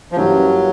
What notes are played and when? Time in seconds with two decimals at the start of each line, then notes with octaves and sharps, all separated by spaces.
0.12 F3
0.16 G2 E3 F#3 G3 A#3 C#4